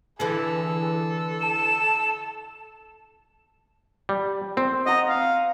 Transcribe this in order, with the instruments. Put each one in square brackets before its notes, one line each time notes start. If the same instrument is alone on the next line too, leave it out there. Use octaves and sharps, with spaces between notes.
[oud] D3 E3 [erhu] G#4 [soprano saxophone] A4
[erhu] A5 [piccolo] E7
[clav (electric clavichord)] G3
[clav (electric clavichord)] C4 [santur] C5
[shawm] D#5 [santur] F#5 A#5 C#6
[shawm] F5